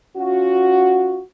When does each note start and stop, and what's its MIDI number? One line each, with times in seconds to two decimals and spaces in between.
0.17 1.19 61
0.17 1.19 65
0.17 1.19 66